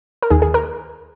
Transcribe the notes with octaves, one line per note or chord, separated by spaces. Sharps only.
A#4
D#2 D#3 G#4
G#4
A#4